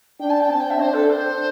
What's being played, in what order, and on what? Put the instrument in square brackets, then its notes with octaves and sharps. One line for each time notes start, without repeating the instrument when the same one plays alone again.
[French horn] D4 [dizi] G5
[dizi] A5
G5
[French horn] C4 [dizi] A5
[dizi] G5
E5
[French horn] D4 [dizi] C5
[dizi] A4
C5